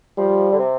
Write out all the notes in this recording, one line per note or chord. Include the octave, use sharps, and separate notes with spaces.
F3 G3
D3
C3